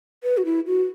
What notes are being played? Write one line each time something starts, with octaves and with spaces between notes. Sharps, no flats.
B4
F#4
E4
F#4